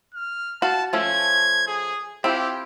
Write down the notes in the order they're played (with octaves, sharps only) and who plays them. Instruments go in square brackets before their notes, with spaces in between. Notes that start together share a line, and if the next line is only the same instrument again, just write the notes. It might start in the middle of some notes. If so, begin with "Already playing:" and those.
[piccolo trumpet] F6
[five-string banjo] F#4 F5 [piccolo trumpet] A5
[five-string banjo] F3 A3 C#4 [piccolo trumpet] G#6
[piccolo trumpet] G#4
[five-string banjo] C4 E4 F4 [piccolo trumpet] G4